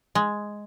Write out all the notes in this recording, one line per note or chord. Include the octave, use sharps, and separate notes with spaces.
G#3